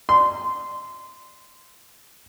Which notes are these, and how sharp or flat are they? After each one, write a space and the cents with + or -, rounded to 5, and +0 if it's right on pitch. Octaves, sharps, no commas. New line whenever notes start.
C6 -15